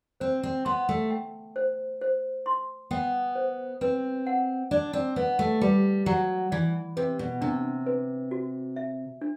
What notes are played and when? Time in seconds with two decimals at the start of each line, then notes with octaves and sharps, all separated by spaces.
0.20 C4 C5
0.43 C4
0.65 B3 C6
0.89 A3
1.10 G5
1.56 C5
2.01 C5
2.46 C6
2.91 B3 G5
3.35 C5
3.81 C4 B4
4.27 F#5
4.71 D4 D5
4.93 C4
5.16 B3 B4
5.39 A3
5.61 G3 B4
6.06 F#3 F#5
6.52 E3 D5
6.97 C3 B4
7.19 B2
7.41 C3 D4
7.86 B4
8.31 F#4
8.76 E5
9.21 D4